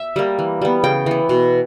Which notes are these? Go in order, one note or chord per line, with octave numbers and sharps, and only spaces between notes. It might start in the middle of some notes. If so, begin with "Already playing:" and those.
Already playing: E5
G3 A#3
E3
G3 B3
C#3 G5
E3 B3
B2